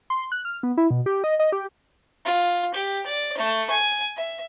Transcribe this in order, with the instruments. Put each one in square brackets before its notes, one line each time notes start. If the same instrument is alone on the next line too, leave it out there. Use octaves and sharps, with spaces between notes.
[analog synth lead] C6
F#6
F6
B3
E4
B2
G4
D#5
D#5
G4
[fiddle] F4
G4
D5
A3
G#5
E5